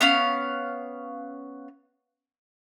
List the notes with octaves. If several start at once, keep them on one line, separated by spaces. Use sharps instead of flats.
B3 C#4 F5